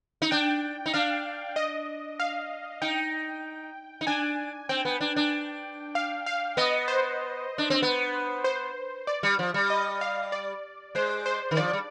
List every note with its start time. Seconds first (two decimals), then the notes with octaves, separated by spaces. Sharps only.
0.22 D#4
0.31 D4 G5
0.86 D#4
0.94 D4 F5
1.56 D#5
2.20 F5
2.82 D#4 G5
4.01 D#4
4.07 D4 G#5
4.69 C4 G5
4.85 B3
5.01 D4
5.16 D4
5.95 F5
6.26 F5
6.57 B3 D#5
6.88 C5
7.58 D4
7.70 C4
7.82 B3
8.44 C5
9.07 D5
9.23 G3
9.39 F3
9.54 G3
9.70 D#5
10.01 F5
10.32 D5
10.95 G#3 C5
11.26 C5
11.51 D#3
11.57 F3 D5
11.73 G3